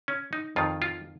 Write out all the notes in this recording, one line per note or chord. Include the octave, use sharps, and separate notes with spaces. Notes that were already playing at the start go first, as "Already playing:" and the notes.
C#4
D#4
F2 D#3 F4
F4